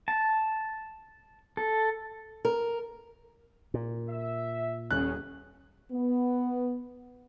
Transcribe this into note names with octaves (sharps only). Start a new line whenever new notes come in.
A5
A4
A#4
A#2
E5
D#1 E2 C#3 C#4 F#6
B3